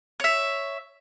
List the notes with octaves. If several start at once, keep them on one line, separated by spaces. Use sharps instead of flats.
C#5 E5